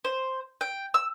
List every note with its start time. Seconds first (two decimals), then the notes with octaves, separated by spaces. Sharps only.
0.05 C5
0.61 G5
0.94 E6